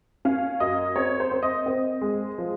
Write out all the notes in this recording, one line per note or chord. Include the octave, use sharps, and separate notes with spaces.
C#4 F5
F#2 D#5
C4 C#5
C5
C4
D#5
C4 D#5
G#3
F3